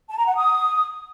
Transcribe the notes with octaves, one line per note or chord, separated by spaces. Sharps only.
A5
A#5
F#5
D#6